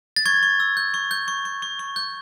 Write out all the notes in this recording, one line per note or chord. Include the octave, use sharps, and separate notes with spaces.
A6
C#6 G#6
C#6
E6
G6
C#6
G6
C#6
C#6
C#6
C#6
G6